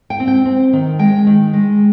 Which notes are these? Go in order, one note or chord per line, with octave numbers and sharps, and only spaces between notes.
G5
C4
G5
C4
D#3
G#3 G5
D#3
G#3